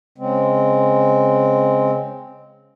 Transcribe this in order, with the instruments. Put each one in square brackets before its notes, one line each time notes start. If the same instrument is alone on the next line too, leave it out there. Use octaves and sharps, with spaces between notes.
[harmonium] C#3 G#3 C4